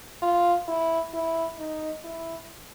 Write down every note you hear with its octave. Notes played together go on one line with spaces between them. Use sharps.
F4
E4
E4
D#4
E4